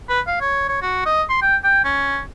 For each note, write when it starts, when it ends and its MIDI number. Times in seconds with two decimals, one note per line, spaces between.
0.09 0.20 71
0.27 0.38 77
0.41 0.64 73
0.68 0.77 73
0.82 1.03 66
1.06 1.23 75
1.29 1.40 84
1.42 1.56 79
1.64 1.83 79
1.84 2.20 61